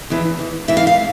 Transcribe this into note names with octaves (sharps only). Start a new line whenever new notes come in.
E2 E3
E2 E3
E2 E3 E5
F5
F5